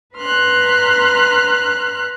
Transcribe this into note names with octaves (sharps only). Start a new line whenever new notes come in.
B4 A#5 C6 F6 F#6